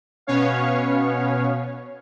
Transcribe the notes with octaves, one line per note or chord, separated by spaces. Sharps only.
B2 B3 C#4 C#5 F5